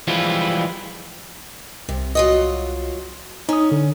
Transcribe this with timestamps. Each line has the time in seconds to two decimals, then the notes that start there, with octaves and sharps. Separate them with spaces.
0.08 E3 F3 G3 G#3 E4 F4
1.89 C2 C3
2.15 F#3 F4 D#5
3.49 C#4 D#4 D#6
3.72 D3